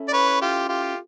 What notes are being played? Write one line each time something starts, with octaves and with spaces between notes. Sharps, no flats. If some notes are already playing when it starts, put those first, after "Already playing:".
Already playing: C#4 E4 A4
D5
B4 C#5
F4 G4
F4 G4